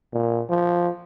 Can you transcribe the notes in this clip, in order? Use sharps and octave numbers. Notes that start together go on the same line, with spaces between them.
A#2
F3